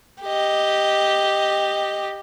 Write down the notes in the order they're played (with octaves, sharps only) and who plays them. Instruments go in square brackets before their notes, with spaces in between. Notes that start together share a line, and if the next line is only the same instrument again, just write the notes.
[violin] G4 D#5